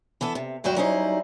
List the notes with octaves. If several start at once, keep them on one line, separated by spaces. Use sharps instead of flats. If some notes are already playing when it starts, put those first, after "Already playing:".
E3 B3 A4
C3
D2 G2 F#3 F#4 G5
F#3 G3 C#4 D#4 E4 C5